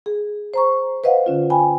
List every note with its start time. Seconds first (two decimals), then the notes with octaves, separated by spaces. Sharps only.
0.06 G#4
0.54 C5 A#5 C#6
1.04 B4 C5 D#5 F5 F#5
1.26 D3 C#4 F4
1.50 G5 G#5 B5